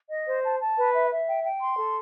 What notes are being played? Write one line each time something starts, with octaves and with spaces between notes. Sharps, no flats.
D#5
C5
A5
A5
B4
E5
E5
G5
G5
C6
A4